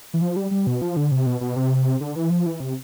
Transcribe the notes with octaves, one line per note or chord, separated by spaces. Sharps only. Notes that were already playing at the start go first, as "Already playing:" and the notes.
E3
F3
G3
G3
B2
F3
D3
C3
B2
B2
C3
D3
E3
F3
E3
C3